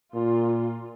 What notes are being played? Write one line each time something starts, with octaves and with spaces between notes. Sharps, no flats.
A#2 F4